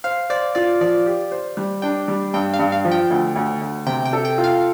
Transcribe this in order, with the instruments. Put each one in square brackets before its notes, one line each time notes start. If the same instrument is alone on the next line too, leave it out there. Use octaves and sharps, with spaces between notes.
[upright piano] C5 [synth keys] F5
[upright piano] C5 [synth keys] D5
[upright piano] F4 [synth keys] D5
[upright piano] F3 [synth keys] D5
[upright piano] G4
C5
G3
[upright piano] D4 [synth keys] G5
[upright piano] G3
[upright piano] G2 [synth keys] G5
[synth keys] F5
[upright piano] G2
[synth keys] F5
[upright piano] F3
[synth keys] G5
[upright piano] D2
D2
D2
[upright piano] C3 [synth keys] G5
[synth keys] G5
[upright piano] A4
[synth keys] G5
[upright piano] F4
[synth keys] F5